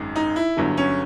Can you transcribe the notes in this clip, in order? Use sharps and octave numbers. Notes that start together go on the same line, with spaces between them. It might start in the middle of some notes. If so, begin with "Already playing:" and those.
Already playing: G#1 F#2 D#3 G#3
D#4
E4
G1 G2 D3 F#3
C#4